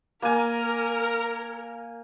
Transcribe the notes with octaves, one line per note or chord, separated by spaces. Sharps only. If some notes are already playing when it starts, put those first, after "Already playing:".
A#3 A#4 G#5